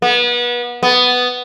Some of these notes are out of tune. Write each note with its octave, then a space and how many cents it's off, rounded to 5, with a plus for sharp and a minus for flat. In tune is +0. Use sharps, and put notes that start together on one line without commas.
B3 -30
B3 +5